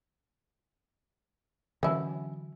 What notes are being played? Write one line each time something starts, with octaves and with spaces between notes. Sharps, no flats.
D3 E3 F#3 C#4 E4